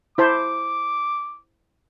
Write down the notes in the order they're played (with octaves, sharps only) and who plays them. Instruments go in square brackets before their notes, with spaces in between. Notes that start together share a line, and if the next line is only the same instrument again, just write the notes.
[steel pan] E4 C5 A5 [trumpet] D6